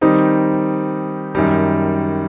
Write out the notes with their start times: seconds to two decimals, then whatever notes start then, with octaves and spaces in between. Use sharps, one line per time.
0.01 D#3 G3 C4 D#4
1.35 F#2 D#3 G3